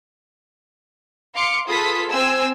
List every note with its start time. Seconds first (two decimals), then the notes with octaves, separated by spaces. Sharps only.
1.35 F5 C6 D6 C#7
1.67 F4 G#4 A4 B4 D#6 B6
2.09 C4 G#5 E6